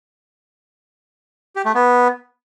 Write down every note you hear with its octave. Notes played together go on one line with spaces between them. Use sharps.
G4
A3
B3